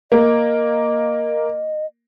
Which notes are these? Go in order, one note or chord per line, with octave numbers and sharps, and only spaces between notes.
A#3 D#5